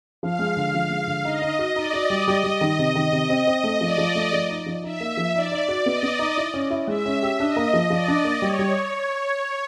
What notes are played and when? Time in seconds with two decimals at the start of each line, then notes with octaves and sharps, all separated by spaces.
0.22 F3 F5
0.39 G#3
0.56 D3
0.74 F3
0.90 G#3
1.07 D3
1.25 D#4 D#5
1.42 D#4
1.59 F#4
1.76 D#4 D5
1.93 F#4
2.10 G3
2.27 G3 D#5
2.44 G3
2.61 D#3
2.79 C3
2.95 D#3
3.12 C3
3.30 C4
3.47 C4
3.64 A3
3.81 F3 D5
3.98 F3
4.15 A3
4.33 F3
4.49 D#4
4.66 F3
4.83 D#4 E5
5.00 A#3
5.17 F3
5.34 D#4 D5
5.52 D#4
5.68 F#4
5.86 B3 D#5
6.03 B3
6.19 D#4
6.37 E4
6.54 C#4
6.70 E4
6.88 G#3 E5
7.06 C#4
7.23 G4
7.39 D4 D#5
7.56 A#3
7.74 F3
7.90 F3 D5
8.08 D4
8.25 A#3
8.42 G3 C#5
8.59 G3